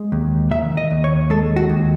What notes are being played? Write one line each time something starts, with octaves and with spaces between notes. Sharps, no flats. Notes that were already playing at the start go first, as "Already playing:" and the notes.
Already playing: G#3
D#2
D#3 E5
D#5
D#2
C#5
G#3 A4
F#4
D#2